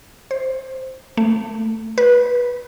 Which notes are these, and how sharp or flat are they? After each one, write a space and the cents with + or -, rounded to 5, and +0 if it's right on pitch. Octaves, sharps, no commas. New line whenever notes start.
C5 +0
A3 +15
B4 -20